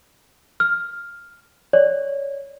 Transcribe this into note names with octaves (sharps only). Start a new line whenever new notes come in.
F6
C#5 D5